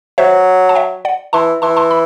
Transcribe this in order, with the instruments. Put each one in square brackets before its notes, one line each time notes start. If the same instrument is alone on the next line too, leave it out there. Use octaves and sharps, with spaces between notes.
[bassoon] F#3 [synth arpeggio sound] C5 E5
[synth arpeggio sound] A5
E5 G5
D5 F#5
[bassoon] E3 [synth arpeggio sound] A5 C6
[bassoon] E3 [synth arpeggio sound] A5 C6
[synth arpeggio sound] A5 C6
B5